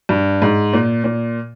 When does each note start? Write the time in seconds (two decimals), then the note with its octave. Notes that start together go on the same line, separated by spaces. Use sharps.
0.09 G2
0.42 G#2
0.73 A#2
1.04 A#2